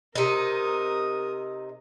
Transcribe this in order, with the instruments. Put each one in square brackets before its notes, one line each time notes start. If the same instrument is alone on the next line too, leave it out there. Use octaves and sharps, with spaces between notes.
[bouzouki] C3 D#4 [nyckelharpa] A#4 D#6